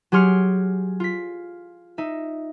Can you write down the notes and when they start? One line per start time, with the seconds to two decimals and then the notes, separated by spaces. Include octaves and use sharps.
0.12 F#3 G4 G#4 C6 F6 C#7
1.00 F4 B6
1.98 D#4 E5